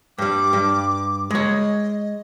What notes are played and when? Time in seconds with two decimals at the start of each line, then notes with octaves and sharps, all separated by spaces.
0.18 G2 G3 D6
0.53 G2
1.31 G#3 C#5 D#5